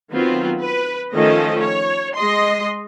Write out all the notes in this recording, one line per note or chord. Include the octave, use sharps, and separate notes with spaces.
D#3 F#3 B3 C4 F4
B4
D#3 F3 A3 C#4 A4 D#5
C#5
G#3 D#5 C6